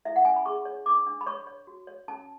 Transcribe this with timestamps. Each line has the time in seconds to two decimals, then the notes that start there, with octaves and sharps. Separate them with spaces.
0.05 E4 E5
0.16 F#5
0.25 C#4 G#5
0.36 B5
0.46 G#4 C#6
0.65 C#5
0.86 D4 D6
1.06 D4
1.21 B5
1.26 C#5 C#6
1.47 C#5
1.67 F#4
1.87 C#5
2.08 C#4 A5